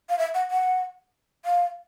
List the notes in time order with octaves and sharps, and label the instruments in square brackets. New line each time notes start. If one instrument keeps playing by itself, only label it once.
[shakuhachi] F5
E5
F#5
F#5
F5